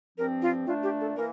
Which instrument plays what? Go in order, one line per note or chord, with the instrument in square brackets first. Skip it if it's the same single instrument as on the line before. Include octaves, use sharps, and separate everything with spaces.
[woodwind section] G2 F3 C4 [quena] A#4
[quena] F4
[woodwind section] A#2 A3 D4 [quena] F4
[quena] G4
A4
[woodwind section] E3 A#3 [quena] A#4